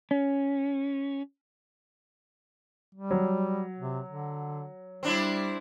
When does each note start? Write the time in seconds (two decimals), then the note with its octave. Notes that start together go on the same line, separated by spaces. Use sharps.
0.11 C#4
2.95 G3
3.11 F#3
3.78 C3
4.08 D3
5.03 G3 C4 D4 E4